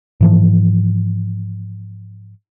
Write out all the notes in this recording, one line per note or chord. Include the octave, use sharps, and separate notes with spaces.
G#2 E3 F3